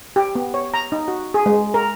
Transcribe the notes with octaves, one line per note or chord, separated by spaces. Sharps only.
G4
B3
C#5
A#5
D#4
F#4
G#4
G#3
A#4